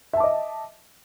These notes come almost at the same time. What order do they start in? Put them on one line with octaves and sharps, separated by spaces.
E5 A5 D6 D#5